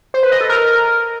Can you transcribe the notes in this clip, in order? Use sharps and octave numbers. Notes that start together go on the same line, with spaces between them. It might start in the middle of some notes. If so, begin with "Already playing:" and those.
C5
B4
D#5
A4
A#4